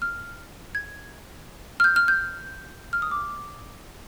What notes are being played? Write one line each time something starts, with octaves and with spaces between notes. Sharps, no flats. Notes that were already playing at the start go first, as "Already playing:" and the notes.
F6
G#6
F6
G6
F6
G6
F6
D#6
D6